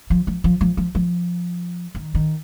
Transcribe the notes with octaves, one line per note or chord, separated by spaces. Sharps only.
F3
F3
F3
F3
F3
F3
D#3
D#3